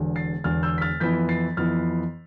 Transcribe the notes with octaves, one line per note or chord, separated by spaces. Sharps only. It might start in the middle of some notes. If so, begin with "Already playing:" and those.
Already playing: E1 E2 D3
A6 C7
E1 E2 D3 F6 A6
E6 G6
B6
F6 A6
F2 E3 B3 E4 G6 B6
A6 C7
F2 E3 B3 E4 F6 A6